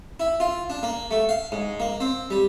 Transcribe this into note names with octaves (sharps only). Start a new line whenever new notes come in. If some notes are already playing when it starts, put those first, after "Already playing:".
E4
F4
D4
A#3
A3
F5
G#2
A#3
C4
G3